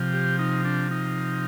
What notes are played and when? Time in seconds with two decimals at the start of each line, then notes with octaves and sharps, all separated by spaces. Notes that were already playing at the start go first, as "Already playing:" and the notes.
Already playing: C3 F3
0.13 G4
0.39 D#4
0.65 D4
0.91 D#4